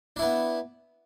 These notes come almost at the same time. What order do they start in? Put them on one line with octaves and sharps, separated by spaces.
D4 E4 B3